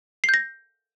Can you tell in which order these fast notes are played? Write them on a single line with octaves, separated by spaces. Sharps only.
C7 G6 A#6